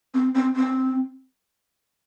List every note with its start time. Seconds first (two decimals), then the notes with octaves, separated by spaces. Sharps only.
0.14 C4
0.35 C4
0.56 C4